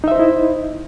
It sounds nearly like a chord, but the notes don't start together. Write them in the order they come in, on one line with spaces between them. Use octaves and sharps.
D#4 E5 C5 D#5 E4